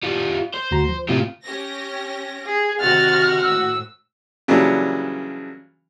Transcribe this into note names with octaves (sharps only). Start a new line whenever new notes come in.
G3 F4
C5
D2 F#4 A#5
F3
A2 C3 F4
C#4 G4 A#6
G#4
C3 D#3 C4 F#4 F#5 F6 A6
A2 E6
C#3 E3 F#3 G3 A#3 D4